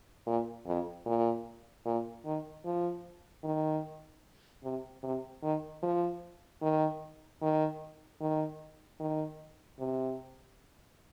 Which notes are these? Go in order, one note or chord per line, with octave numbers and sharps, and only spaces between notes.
A#2
F2
A#2
A#2
D#3
F3
D#3
C3
C3
D#3
F3
D#3
D#3
D#3
D#3
C3